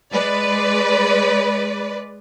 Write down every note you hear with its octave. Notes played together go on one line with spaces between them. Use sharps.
G#3 B4 D5